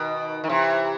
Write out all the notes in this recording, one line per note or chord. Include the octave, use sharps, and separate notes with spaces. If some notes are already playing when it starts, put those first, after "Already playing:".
Already playing: B2 D#3
D#3
C3 E3